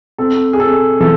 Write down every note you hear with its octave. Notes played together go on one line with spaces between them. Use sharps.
C4 A4
G#4
C4 A4
E3 A4